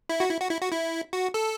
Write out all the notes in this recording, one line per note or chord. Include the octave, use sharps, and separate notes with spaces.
E4
F#4
E4
F#4
E4
F#4
E4
F#4
A4